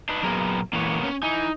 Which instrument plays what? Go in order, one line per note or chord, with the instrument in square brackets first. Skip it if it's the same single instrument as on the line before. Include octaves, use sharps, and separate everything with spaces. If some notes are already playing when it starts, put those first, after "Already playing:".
[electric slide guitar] D4 D#4 B4
[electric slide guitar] A#2 B3 A#4 [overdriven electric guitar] F#3 G#4
[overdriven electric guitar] A#2 E3 [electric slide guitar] A#3 B3 C#5
[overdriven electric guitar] C#4
[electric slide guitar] D#4 [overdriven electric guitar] E4 G#5